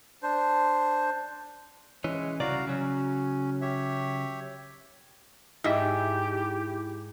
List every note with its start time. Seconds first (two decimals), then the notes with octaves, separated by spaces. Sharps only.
0.23 D4 C5
2.04 E3 G#3 C#4
2.40 C2 C#3 F#4 D5 F5 A#5
2.67 C#3 F#3 C#4
3.61 G4 C#5 E5
5.64 G#2 E4 G4 D#5 E5